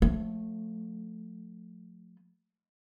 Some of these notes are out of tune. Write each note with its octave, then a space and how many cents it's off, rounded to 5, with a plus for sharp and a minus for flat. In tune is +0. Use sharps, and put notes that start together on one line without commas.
F3 +35 A3 +0